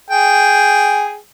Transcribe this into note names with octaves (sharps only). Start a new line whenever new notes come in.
G#4 G5